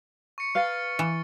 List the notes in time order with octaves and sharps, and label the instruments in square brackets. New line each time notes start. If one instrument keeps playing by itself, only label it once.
[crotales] C#6 C#7
[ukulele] B4 F5 [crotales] F6 A6
[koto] E3